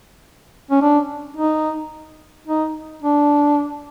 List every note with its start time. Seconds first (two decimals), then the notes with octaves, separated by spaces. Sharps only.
0.71 C#4
0.82 D4
1.37 D#4
2.47 D#4
3.03 D4